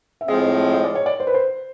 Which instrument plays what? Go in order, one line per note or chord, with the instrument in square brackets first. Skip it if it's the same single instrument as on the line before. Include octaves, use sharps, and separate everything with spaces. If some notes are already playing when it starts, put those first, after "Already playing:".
[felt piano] E5
[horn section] A2 F3 G#3 C4 [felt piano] D#5
[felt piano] D#5
D5
C#5
D5
C5
B4
C5